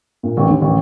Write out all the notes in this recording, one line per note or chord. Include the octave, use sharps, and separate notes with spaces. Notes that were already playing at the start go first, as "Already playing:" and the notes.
A#2
A1
D#2
A1